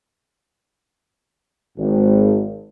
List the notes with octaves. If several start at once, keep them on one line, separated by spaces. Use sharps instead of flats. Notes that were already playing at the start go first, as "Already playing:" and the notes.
G#1